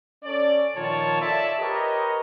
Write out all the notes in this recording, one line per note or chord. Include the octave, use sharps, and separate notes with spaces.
C#4 A4 C#5 D5
A#2 D#3 F3 F4 C#5 A5
F4 A4 C#5 D5 E5 A5
G4 A#4 B4 C#5 D#5